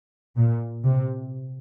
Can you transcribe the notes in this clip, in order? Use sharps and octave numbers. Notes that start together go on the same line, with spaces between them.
A#2
C3